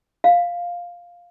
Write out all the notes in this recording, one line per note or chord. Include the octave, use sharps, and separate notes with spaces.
F5